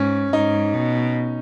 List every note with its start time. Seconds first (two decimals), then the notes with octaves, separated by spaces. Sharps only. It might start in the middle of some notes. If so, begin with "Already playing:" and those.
Already playing: G#2 C#4
0.33 G#2 D#4
0.74 B2